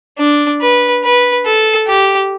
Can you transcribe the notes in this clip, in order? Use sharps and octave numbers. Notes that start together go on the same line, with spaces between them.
D4
B4
B4
A4
G4